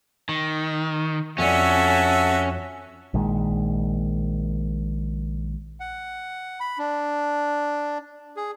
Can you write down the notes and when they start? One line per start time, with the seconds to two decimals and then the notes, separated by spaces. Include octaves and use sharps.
0.29 D#3
1.38 F2 C#4 F#4 A4 D5 E5
3.14 A#1 A#2 D#3 G#3
5.80 F#5
6.60 B5
6.78 D4
8.37 G#4